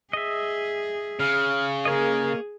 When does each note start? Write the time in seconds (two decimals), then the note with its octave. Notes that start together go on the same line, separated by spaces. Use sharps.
0.13 G#4 D#5 E5
1.20 C#3 F6
1.85 A#3 G#4 A#4 C#5 D#5